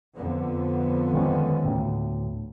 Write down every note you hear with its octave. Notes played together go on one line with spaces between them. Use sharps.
F2 D3 B3
D#3 G#3 C#4
D2 A2